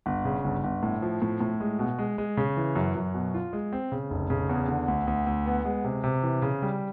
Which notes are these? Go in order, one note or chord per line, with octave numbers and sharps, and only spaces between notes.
G1
C#3
G1
G1
A2
F3
A2
A2
G#3
B2
G#3
G#3
C#3
E3
F#2
F#2
B2
F4
G#3
C4
C#3
F1
C#3
E2
D3
D2
D2
D2
B3
G#3
C3
C3
E3
C#3
G3